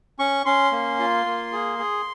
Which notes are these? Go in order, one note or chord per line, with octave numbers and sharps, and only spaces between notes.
C#4 C#6
C#4 C6
A#3
F4
A#3
G#4
G#4